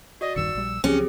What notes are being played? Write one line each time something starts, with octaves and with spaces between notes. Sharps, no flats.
F#4 D5 D#5
D#1 G2 D#3 E6 C#7
A#1 G3
C#2 F3 F#3 C4 C#4 G4 G#4